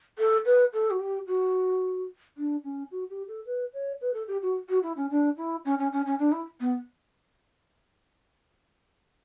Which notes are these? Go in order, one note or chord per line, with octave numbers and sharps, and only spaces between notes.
A4
B4
A4
F#4
G4
F#4
D4
C#4
F#4
G4
A4
B4
C#5
B4
A4
G4
F#4
F#4
E4
C#4
D4
E4
C#4
C#4
C#4
C#4
D4
E4
B3